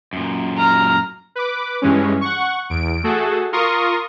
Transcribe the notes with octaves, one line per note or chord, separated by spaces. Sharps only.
F#2 A#2
A#5 F6
B4 D6
G2 E3 G#3 C#4
F#5 C#6
E2 D7
A3 F#4 G#4 A4
F4 A#4 C6 C#6 D#6